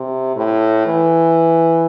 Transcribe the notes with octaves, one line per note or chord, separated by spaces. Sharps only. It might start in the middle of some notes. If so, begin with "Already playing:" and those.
Already playing: C3
A2
E3